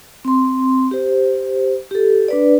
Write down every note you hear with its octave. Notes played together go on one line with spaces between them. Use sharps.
C4 C6
G4 C5
G4 A4
D4 B4 D5